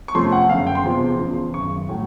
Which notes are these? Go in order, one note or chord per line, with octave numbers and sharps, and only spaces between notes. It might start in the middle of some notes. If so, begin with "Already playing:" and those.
C#6
F2 C3 F3 A3 C#4 C6
F#5
F#1 F#2 D3 F5
G5
C6
E1 E2 C3 F3
E2 C#3 F3
G#1 F#2 C#3 C#6
A2 F#3 A3